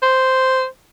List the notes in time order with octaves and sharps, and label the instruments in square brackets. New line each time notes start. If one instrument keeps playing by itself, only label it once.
[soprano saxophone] C5